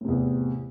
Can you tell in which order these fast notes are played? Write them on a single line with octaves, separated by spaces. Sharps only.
A2 C3 E2